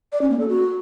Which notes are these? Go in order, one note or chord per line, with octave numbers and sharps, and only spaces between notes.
D5
C#4
A#3
A4
F#4